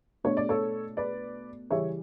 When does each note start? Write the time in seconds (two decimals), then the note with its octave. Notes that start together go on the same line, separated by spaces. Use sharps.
0.24 B2 A3 D4 C#5
0.37 D5
0.49 A4 C#5
0.97 B4 D5
1.70 C#3 E3 G3 C#4 C#5 E5